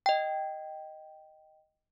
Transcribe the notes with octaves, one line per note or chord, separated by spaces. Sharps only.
D#5 G5